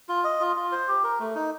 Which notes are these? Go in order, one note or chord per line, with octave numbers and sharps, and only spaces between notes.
F4
D#5
F4
F4
C5
G4
A#4
A3
D#4